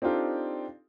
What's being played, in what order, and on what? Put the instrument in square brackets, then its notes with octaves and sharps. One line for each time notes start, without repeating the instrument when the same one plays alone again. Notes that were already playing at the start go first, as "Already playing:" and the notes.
[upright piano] C4 D4 D#4 F4 G4 A4